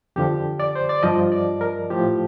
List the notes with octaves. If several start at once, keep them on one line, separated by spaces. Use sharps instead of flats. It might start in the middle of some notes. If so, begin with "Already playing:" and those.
F2 D3 F3 G4
D5
C5
D5
G2 F3 D#5
D5
A#4
A2 F3 G4